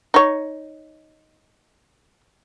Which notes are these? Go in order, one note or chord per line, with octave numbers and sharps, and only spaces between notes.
D#4 C#5